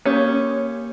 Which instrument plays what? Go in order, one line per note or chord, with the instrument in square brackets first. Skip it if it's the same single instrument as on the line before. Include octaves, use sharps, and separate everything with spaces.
[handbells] A#3 G4 G6 [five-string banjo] C#4